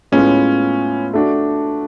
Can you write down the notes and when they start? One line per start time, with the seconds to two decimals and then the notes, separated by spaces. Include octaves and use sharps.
0.12 A2 G#3 B3 C#4 F4
1.14 A3 D4 F#4